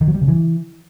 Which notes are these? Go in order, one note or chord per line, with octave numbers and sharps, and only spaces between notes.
D#3
F#3
G3
C#3
E3